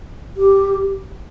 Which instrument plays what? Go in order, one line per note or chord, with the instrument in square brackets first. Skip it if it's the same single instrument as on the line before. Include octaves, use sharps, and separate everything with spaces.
[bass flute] G4